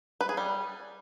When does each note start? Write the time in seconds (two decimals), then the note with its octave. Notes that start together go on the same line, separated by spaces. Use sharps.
0.21 B4
0.29 G#4
0.37 G3